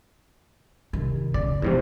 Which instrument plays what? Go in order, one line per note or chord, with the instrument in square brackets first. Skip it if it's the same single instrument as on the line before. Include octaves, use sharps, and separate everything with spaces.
[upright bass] C3 D#3
[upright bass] C#3 [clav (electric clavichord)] D5
[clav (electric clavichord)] E2 G#2 C3 [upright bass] F3